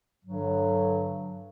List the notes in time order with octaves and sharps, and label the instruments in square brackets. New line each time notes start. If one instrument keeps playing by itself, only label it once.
[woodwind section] G2 D3 F#3